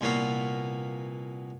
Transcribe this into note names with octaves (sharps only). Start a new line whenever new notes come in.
C2 A#2 A#3 B3 C#5 F5